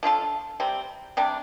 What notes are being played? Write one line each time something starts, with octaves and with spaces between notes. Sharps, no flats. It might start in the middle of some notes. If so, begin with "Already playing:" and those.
F3 D4 F4 A4
C3 G3 C4
C3 G3 D4